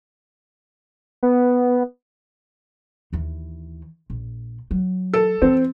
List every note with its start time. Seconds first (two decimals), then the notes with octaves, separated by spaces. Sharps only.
1.23 B3
3.13 D#2 E3
4.10 A#1
4.71 F#3
5.14 A4
5.42 E3 C4